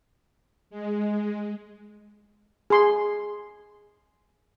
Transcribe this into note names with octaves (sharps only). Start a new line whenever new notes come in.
G#3
G#4 C6